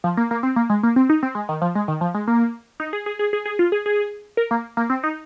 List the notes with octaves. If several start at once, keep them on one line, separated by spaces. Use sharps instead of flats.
F3
A#3
A#3
C4
A#3
G#3
A#3
C4
D#4
C4
G#3
D#3
F3
G#3
D#3
F3
G#3
A#3
D#4
G#4
G#4
G#4
G#4
G#4
F4
G#4
G#4
A#4
A#3
A#3
C4
D#4